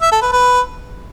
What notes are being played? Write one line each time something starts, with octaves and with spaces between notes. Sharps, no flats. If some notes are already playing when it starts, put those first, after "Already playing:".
E5
A4
B4
B4